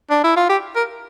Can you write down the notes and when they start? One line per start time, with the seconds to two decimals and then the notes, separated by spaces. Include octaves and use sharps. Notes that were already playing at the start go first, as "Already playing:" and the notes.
0.11 D4
0.24 E4
0.37 F4
0.49 G4
0.76 A#4